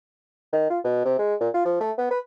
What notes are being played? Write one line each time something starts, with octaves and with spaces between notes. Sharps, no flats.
D#3
F4
B2
C3
G#3
A#2
F4
F3
A3
B3
B4